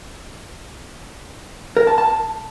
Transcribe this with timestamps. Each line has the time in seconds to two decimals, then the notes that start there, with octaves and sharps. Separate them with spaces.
1.77 A#4
1.87 A5
1.98 A5